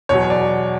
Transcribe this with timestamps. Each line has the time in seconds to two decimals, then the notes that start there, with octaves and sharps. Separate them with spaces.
0.09 E2 B2 F#3 C#5
0.30 D5